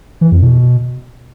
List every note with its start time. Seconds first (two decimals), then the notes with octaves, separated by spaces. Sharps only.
0.21 E3
0.32 F2
0.42 B2